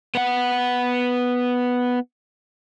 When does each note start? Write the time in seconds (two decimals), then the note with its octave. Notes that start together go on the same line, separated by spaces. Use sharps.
0.15 B3 F#5